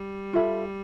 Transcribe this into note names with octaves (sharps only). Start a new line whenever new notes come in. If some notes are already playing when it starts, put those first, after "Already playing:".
Already playing: G3
F4 A4 E5 B5